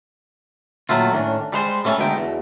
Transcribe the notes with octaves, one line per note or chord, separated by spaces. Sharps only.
A#2 D#3 F#3 A3 F4
A2 D#3 C#4 D4
G3 G#3 C5
G3 A3 C#4 G#4 A4
D2 B2 G#3 A3 D#4 G5
E2 B2